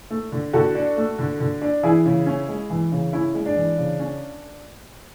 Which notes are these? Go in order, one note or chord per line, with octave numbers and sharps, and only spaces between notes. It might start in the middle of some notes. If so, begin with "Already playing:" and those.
A3
D3
D3 F#4 A4
D4
A3
D3
D3
D4
E3 E4 G#4
C#3
C#4
G#3
E3
C#3
C#4 E4
G#3
D4
E3
C#3
C#4